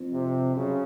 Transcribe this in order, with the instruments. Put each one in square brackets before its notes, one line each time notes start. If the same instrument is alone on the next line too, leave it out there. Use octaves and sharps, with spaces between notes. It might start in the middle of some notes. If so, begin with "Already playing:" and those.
Already playing: [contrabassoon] F2
[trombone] C3
[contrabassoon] F#2 [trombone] C#3